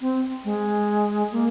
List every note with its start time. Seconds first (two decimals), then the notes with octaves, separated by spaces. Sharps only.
0.01 C4
0.45 G#3
1.32 A#3